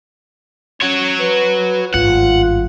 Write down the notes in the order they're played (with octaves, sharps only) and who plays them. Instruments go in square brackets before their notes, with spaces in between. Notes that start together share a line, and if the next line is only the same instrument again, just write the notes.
[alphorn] C#4 [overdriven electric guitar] F#4 C#5
[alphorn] B4
[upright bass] G#1 G2 [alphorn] F4 [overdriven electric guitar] F#5